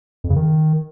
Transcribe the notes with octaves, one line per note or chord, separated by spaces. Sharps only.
F2
C#3
D#3